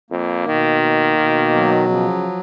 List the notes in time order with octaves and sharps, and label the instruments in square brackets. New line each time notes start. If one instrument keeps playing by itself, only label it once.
[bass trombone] F2 [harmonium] A#3
[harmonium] B2 [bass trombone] D#3
[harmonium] A#3
B2
F#3
[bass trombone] C#3 [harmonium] F3